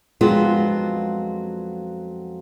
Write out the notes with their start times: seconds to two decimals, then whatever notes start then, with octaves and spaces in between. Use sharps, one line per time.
0.21 F2 F#3 G#3 B3 D4 F4